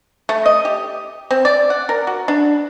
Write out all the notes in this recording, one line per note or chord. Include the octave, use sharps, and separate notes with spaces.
A3
D#5
G4
C4
D5
F#5
A#4
F#4
D4